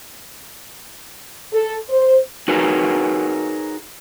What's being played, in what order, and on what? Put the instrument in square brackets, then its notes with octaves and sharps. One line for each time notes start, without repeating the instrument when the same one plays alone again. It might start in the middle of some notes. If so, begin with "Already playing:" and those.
[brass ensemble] A4
C5
[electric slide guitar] D#4 F#4 G#4 A#4 B4 C#5